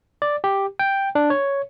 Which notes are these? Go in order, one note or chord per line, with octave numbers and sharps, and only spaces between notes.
D5
G4
G5
D4
C#5